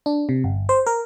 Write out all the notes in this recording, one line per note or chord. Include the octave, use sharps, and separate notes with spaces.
D4
C3
G1
C5
A#4